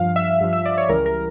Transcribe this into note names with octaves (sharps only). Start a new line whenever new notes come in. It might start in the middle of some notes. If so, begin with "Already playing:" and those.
Already playing: G2 F3 F5
E5
G2 F3
E5
D5
C#5
C#2 C#3 E3 G3 A#4
A#4